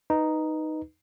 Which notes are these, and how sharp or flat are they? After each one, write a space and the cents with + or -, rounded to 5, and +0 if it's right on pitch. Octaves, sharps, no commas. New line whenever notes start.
D#4 +0 B4 +0